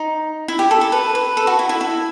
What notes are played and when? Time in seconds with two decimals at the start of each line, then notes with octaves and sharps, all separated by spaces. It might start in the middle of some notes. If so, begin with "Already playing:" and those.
Already playing: D#4
0.48 E4
0.59 G4
0.71 A4
0.81 A4
0.92 B4
1.15 B4
1.37 A4
1.47 F#4
1.59 E4
1.69 E4
1.81 E4